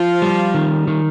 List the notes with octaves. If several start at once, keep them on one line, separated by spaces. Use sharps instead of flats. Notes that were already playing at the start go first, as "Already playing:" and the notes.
Already playing: F3 F4
G3
D#3
D#3